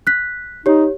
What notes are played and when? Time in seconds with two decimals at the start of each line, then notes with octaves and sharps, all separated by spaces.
0.07 F#6 B6
0.66 D#4 G4 C#5